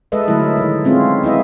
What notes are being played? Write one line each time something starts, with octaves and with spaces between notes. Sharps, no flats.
G#3 A4 B4 D#5 E5
D3 F#3 A3 E4 A#4
D#3 E4
G#3 C4 C#4 F4
B3 E4 D#5 E5